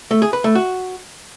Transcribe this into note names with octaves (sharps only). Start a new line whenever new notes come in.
A3
G#4
B4
A3
F#4